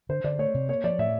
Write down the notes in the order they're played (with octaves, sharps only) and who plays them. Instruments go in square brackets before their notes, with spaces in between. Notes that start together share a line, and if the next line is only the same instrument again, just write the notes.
[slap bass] D3 [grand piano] C5
[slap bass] D3 [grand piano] D5
[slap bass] A3 [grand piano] C#5
[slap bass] C3
[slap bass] A#3 [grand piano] C#5
[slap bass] F3 [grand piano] D5
[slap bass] A2 [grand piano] E5